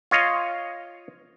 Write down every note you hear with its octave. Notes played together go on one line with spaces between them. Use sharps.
F4 C#5 D#5 F5